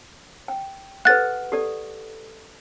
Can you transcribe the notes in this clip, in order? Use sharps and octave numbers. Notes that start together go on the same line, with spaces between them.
G5
G4 A4 B4 F#5 F#6 A6
G4 A4 D5